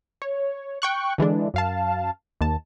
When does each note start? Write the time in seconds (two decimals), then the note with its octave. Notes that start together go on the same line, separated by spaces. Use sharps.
0.22 C#5
0.82 G5 C#6 F#6
1.18 D3 E3 G#3 D4
1.54 F#2 F5 A5
2.41 D#2 A5